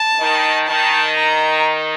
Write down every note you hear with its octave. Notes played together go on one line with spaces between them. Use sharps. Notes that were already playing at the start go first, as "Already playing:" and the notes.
Already playing: A5
D#3
D#3 A5
A#5